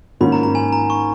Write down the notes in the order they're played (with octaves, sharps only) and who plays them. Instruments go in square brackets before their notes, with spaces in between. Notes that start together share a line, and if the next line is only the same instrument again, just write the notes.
[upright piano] G#2 D#3 A#3 C#4 [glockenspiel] B5
[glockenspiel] A#5
A#5
G#5
A#5
C#6